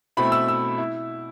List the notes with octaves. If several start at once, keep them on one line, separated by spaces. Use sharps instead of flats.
B2 A3 C4 E4 B5
E6
E6
E4